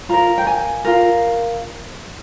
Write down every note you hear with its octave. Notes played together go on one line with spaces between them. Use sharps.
F4 A#4 A#5
G5
G#5
F4 A#4